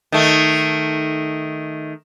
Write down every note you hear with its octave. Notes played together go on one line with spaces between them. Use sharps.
D#3 A3